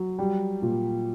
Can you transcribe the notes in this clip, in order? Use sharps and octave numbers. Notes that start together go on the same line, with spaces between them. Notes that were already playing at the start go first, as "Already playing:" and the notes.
Already playing: F#3
G3
A#2